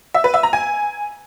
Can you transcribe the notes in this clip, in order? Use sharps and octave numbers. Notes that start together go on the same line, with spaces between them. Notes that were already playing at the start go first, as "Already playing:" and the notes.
E5
B4
E5
A#5
G#5